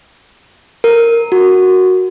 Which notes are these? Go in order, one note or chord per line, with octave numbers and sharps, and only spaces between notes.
A#4
F#4